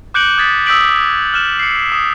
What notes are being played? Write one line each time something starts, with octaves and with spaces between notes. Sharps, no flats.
D6 F#6 G6 C#7 D7 F#7
D#6 G#6 A6 B6
D#6 E6 G6 B6 D7 F#7
F6 F#6 E7
C7 C#7
D#6 E7